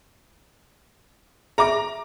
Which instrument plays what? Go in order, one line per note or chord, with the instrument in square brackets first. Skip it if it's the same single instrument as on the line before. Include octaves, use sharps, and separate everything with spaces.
[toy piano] G#4 E5 [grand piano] A#5 D6